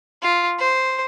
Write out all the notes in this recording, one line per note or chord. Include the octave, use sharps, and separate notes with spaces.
F4
C5